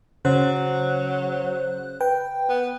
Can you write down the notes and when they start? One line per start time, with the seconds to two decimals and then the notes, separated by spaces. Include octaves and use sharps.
0.25 C#3 F#3 C5 F#6
2.00 B4 G5
2.49 B3